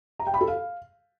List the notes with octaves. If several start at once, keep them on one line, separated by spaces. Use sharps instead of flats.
A#5
G5
B5
A4
F5